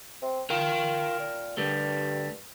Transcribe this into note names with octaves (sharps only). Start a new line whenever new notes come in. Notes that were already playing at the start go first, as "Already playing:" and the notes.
C4
F4 A#4 G5
A#2
G2 D3 G3 A3